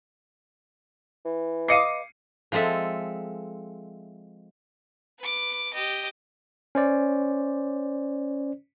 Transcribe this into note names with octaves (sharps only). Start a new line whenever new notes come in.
E3
B4 D#5 F5 D6 D#6 C7 C#7 D#7
F3 G#3 C4 A4 E5
B4 D6
G4 D#5
C#4 C5 D5